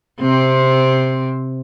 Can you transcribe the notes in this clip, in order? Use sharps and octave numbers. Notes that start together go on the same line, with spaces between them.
C3 C4